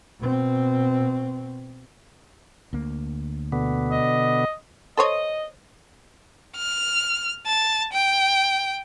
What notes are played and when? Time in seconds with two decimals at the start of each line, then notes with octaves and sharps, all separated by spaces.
0.20 B2 C4
2.73 D2 A#3
3.52 B2 D3 B3
3.91 D#5
4.97 A4 C5 C#5 D#5
6.57 F6
7.46 A5
7.93 G5